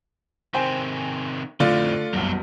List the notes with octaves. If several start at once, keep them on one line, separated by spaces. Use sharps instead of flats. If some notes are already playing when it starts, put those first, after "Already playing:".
C3 D#3 C5 G5 G#5
F2 A2 D3 A3 F4 D5
F#1 B1 E2 G2 F#3